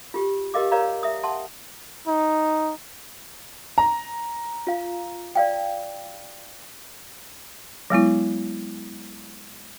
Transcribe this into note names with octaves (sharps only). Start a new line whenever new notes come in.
F4 G4
G4 A#4 D#5 F5 D6
A#4 C#5 D5 F5 A#5
E5 D#6
F#5 A5 C6
D#4
A#5
F4 F5
D5 F5 G5
F#3 G#3 B3 E4